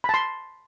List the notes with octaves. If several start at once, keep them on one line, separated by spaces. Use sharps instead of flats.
A5 B5 C6